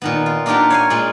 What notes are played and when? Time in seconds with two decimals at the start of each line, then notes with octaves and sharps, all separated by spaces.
0.02 A#2 D#3 B3
0.26 F4
0.46 A#3 D4 D#4 F4 G4 F#5
0.70 C#5 F5 G#5
0.90 A#2 G#3 F4